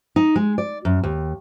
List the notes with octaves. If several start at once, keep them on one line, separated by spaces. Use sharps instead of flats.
D#4
G#3
D5
F#2
D#2